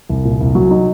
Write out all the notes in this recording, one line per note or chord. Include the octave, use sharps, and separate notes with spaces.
C2
A#2
C2
F#3
D#4